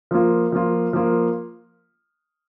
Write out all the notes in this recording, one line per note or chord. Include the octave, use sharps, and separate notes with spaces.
F3 A#3 F4
F3 A#3 F4
F3 A#3 F4